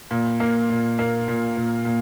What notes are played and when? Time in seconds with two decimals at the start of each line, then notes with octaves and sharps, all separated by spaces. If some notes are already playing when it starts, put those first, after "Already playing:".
0.11 A#2
0.40 A#3
0.70 A#2
0.99 A#3
1.28 A#2
1.57 A#2
1.85 A#2